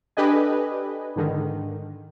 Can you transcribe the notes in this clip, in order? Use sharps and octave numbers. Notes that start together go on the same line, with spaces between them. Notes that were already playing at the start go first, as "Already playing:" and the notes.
D4 G4 A4 B4 D#5 G#5
G#2 D3 D#3